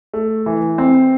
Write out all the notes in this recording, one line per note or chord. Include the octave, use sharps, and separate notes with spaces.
A3
E3
C4